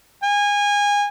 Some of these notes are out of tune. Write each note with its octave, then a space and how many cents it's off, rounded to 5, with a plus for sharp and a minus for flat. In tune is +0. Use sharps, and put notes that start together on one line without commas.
G#5 -25